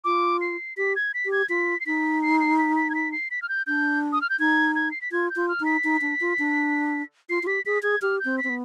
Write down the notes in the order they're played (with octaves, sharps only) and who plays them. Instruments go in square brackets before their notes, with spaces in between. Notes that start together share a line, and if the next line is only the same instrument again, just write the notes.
[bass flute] F4 [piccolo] D6
[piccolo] C7
[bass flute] G4 [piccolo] B6
[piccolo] G#6
B6
[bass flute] G4
[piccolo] G#6
[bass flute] F4 [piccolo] B6
[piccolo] C7
[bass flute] D#4 [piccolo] B6
[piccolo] C7
C7
B6
B6
G#6
B6
C7
B6
F6
G6
[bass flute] D4 [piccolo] G6
[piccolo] D#6
F6
G6
[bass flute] D#4 [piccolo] G#6
[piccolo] G#6
C7
B6
[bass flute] F4 [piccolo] G#6
[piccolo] G6
[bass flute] F4
[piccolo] F6
[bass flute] D#4
[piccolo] B6
[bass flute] D#4
D4
F4
D4
[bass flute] F4 [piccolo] C7
[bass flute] F4
[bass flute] G4 [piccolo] B6
[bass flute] G#4 [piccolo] B6
[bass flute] G#4 [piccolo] G#6
[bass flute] G4 [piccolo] F6
[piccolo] G6
[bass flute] C4
[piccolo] B6
[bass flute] C4
B3